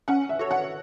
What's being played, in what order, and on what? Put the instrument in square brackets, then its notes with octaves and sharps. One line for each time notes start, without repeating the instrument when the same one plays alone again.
[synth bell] C#4 [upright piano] F#5
[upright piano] E5
[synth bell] F#4 A4 C#5
[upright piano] F#5